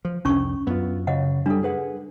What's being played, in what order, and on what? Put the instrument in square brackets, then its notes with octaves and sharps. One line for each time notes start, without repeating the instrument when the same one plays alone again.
[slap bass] F3
[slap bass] C2 F2 [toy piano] C#4 D4 C#6
[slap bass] F#2 [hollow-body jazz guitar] B3 F4
[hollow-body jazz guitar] C#3 [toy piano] D#5 F#5
[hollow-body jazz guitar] G3 [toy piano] D4 A4
[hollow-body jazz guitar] G#4 B4 F#5